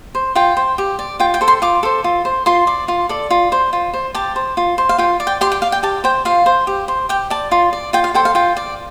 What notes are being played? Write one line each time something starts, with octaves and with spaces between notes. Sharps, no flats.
C5
F4 G5
C5
G4
D5
F4 G5
G5
A4 C5
C6
F4 D6
A4 C5
F4
C5
F4 C6
D5
F4
A4 D5
F4
C5
F4
C5
G4 A5
C5
F4
C5
F5
F4 G5
D5
G5
G4 C6
G5
D5 F5
G5
G4 A5
C5 G5
F4 F5
C5
G4
C5
G4 G5
D5 A5
F4
D5
F4 G5
F5
A4 C5 G5
F5
F4 G5
D5